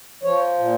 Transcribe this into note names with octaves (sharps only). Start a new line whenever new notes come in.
F3 C#5
A#2